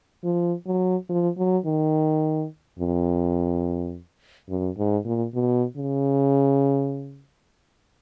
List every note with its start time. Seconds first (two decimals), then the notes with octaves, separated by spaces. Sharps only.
0.24 F3
0.66 F#3
1.09 F3
1.38 F#3
1.66 D#3
2.79 F2
4.49 F#2
4.78 G#2
5.05 A#2
5.34 B2
5.77 C#3